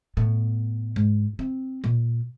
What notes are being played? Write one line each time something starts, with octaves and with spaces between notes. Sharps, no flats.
A2 B3
G#2
C4
A#2